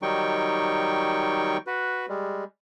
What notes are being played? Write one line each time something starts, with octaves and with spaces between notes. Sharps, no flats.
D#3 F#3 G3 D#4 G5 C#6
F#4 B4
G3 G#3